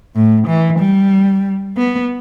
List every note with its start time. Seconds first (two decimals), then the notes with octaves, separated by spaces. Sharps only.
0.16 A2
0.48 E3
0.79 G3
1.77 B3